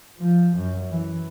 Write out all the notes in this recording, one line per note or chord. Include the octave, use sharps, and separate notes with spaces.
F3
F#2
E3